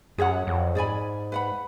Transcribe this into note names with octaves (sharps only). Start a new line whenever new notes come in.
F#2 G#4 C#5 F#5
F2
G#2 G#4 D5 G#5 B5
B4 F#5 B5